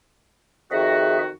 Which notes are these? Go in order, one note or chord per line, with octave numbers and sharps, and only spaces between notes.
F2 D#3 F#4 G#4 E5